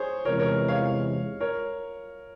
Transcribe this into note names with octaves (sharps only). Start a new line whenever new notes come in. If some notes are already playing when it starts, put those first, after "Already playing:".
Already playing: G#4 C5 C#5
E2 C3 E3 G#3 E4 A#4 C#5
A#4 C#5
C#5 F5
A#4 C#5